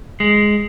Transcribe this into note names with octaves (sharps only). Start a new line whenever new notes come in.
G#3